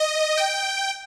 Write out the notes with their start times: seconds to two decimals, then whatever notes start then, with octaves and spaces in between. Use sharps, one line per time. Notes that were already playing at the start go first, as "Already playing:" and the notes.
Already playing: D#5
0.37 G5